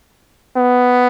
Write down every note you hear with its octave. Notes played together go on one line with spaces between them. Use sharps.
B3